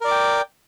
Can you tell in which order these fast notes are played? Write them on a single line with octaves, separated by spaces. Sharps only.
A#4 D5 D6 G5